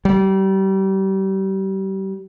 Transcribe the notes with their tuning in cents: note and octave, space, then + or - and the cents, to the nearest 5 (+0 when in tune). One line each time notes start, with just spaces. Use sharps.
G3 -30